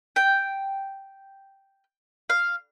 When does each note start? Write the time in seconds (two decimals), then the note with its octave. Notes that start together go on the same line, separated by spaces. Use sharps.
0.16 G5
2.30 F5